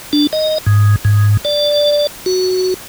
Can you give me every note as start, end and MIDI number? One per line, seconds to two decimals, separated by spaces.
0.13 0.27 62
0.33 0.58 75
0.66 0.96 44
1.05 1.37 44
1.45 2.07 74
2.26 2.74 66